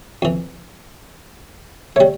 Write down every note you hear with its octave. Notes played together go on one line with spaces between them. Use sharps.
F2 E3
G3 A3 C#5